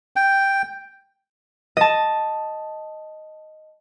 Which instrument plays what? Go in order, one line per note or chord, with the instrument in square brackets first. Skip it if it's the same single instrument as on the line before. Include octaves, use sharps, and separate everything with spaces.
[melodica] G5
[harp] D#5 A5